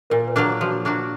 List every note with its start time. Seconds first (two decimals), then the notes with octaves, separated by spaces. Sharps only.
0.10 A#2 A#4
0.28 B4
0.36 F#3 A#3 D4
0.44 G#4
0.61 F3 F#4
0.85 A#3 D4 F#4